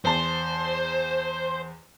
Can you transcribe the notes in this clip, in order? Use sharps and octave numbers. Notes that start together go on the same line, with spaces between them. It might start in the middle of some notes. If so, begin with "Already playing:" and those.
E2 C5 A5